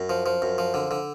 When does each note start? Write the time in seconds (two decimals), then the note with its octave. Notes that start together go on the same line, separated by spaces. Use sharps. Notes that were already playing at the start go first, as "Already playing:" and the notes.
Already playing: F#2
0.09 F3
0.26 F3
0.42 F#2
0.58 F3
0.74 D3
0.91 D3